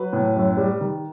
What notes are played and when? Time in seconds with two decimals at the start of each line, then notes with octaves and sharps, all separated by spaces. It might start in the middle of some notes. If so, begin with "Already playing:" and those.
Already playing: F#3 B4
0.13 A2
0.35 F#2
0.57 G3
0.80 D#3